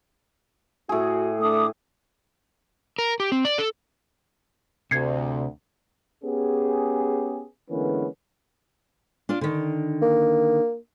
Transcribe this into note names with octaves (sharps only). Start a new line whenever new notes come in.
A2 F#4 G#4
A3 D4 D6 D#6
A#4
G4
C4
D5
A4
D2 C3 G#6 C7 C#7
B3 C#4 G4 G#4
D3 E3 G#3 A#3 B3 C#4
D4 F4 D5
D3 D#3
A#3